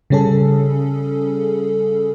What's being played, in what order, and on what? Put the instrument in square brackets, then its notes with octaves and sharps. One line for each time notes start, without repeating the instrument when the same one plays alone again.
[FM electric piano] C#3 G3 C#4 G#4 A4